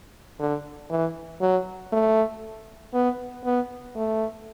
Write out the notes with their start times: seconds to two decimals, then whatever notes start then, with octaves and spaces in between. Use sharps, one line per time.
0.40 D3
0.90 E3
1.41 F#3
1.92 A3
2.94 B3
3.45 B3
3.95 A3